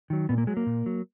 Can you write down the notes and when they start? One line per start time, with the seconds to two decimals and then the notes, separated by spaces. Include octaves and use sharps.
0.10 D#3 F#3
0.29 A#2 B3
0.38 A#3
0.47 F#3 G#3
0.57 A#3
0.66 A#2
0.86 F#3